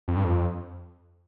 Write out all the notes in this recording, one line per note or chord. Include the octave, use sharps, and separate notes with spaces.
F2
G2
F2